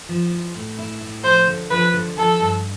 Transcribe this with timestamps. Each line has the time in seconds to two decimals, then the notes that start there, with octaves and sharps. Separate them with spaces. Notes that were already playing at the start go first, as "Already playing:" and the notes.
0.09 F3
0.31 E4
0.55 A2
0.79 E4
1.01 A2
1.24 F3 C5
1.47 D3
1.71 F3 B4
1.94 D3
2.17 F3 A4
2.40 G2